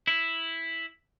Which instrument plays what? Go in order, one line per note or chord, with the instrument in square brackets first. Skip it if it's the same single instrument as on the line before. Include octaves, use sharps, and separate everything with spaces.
[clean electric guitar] E4